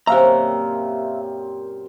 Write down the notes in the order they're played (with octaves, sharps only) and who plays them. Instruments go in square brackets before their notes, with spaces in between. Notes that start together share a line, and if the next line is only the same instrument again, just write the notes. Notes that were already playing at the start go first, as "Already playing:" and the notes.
[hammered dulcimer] F#2 A#2 C4 [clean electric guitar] G4 A#5 [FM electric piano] E5 F5